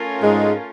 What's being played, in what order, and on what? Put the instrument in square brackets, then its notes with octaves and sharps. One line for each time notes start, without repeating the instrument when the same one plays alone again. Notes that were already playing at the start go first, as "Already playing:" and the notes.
Already playing: [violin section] A3 C#4 F4 A#4
[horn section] G#2 G#3